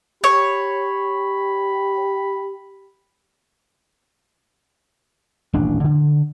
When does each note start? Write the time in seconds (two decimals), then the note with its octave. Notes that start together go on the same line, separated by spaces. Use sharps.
0.24 G4 C#5 B5
5.53 D#1 A1 D4
5.84 D3